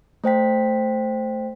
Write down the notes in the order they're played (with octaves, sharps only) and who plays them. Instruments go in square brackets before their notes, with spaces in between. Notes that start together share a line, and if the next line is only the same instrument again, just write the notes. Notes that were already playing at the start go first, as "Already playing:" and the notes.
[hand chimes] A3 C5 G5 B6